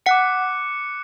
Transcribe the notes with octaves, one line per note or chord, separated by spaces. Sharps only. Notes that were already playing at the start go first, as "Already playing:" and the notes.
F#5 D6 F#6 C#7